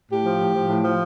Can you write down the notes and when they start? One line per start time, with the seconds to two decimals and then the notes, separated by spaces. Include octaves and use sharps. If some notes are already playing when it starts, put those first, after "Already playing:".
0.10 A2 G4
0.25 F3
0.41 A2
0.55 F3
0.69 A2
0.84 F3